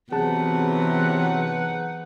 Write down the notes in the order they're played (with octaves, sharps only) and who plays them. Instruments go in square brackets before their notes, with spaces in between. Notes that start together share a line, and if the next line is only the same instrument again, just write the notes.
[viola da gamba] E2 [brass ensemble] C3 F#3 [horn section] D#4 B4 F#5 [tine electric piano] G#4 A5